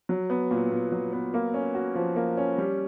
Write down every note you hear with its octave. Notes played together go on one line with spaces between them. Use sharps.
F#3
B3
A#2
A#2
F#3
B3
A#3
C#4
F#4
F3
A#3
C#4
G3